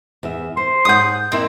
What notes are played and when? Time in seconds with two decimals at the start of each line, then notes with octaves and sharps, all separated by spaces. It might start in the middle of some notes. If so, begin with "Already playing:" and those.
0.23 E2 E5
0.57 C5 C6
0.85 G#2 C#5 F#5 D#6 G6
1.32 F2 A#3 C4 E4